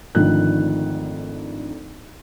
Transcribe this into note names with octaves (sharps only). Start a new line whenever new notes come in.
G#1 D3 D#3 F3 A3 F#6